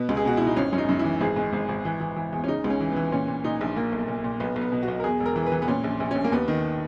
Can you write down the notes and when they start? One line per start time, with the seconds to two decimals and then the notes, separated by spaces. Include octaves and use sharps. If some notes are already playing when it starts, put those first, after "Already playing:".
Already playing: B2 B3
0.09 C#2
0.17 G#4
0.25 B2 F#4
0.37 B2 E4
0.47 D#4
0.56 G#1 C#4
0.73 F#2 C#4
0.78 D#4
0.89 F#2
0.99 E4
1.04 E3
1.21 G#1 G#4
1.36 G#2
1.53 G#1
1.69 G#1
1.85 E3
2.00 E3
2.16 E3
2.33 E2
2.44 C#4
2.48 C#3 D#4
2.64 C#2
2.70 C#4
2.81 E3
2.92 E3 B3
3.12 A#2 C#4
3.28 A#2
3.44 A#2 D#4
3.61 A#1
3.76 A#2 A#3
3.92 B1
4.08 A#2
4.24 A#2
4.40 B1 B3
4.56 B1
4.61 B3
4.72 B2
4.83 F#4
4.88 B1
5.00 A#4
5.04 E2 G#4
5.20 E1
5.26 A#4
5.36 E3
5.46 B4
5.52 E3
5.62 B3
5.68 A#2 C#4
5.84 A#1
6.00 A#1
6.11 A#1 C#4
6.24 A#3
6.32 D#2 B3
6.48 D#3